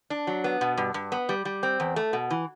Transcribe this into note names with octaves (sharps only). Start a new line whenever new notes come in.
D4
F#3
B3
B2
G2
G2
B3
G3
G3
C4
E2
A3
B2
E3